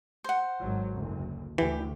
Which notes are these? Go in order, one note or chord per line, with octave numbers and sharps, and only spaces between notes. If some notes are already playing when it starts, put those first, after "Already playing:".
C5 F#5
G#1 F#3
F#1 D2
D2 E3 G4